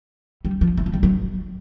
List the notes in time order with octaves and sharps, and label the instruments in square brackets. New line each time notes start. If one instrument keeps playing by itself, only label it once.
[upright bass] G3
F3
E3
F3
G3
F#3